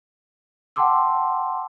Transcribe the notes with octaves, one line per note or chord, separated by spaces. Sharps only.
F#5 G5 A5 C6 D6 E6